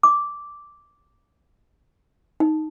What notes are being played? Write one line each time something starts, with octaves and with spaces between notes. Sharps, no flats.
D6
D#4